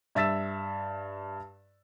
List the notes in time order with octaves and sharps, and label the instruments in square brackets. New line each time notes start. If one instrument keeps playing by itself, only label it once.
[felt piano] G2 E5 E6 A6 B6 E7